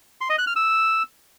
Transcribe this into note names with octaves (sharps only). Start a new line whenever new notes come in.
C6
D#5
F#6
F6
E6